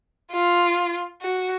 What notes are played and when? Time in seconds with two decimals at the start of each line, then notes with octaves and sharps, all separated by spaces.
0.32 F4
1.21 F#4